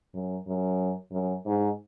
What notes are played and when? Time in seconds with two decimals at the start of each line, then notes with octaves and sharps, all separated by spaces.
0.13 F#2
0.46 F#2
1.11 F#2
1.45 G#2